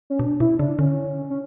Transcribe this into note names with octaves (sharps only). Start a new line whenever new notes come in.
C#4
B2 D4
B2 E4
C#3 D4
D3 C#4
C#4